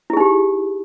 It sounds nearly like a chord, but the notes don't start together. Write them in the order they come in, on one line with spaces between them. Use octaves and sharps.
E4 G#4 D#4 G4